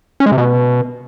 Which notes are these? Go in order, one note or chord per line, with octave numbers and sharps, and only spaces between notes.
C#4
G#3
C3
B2